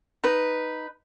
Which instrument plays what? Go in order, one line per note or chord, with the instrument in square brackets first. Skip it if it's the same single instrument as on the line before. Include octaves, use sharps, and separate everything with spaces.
[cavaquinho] D#4 B4